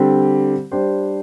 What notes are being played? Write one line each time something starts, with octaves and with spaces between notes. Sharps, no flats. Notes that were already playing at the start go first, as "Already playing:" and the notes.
Already playing: D3 G3 C4 G4
G3 D4 G4 C5